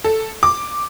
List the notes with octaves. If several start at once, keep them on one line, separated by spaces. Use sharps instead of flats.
A4
D6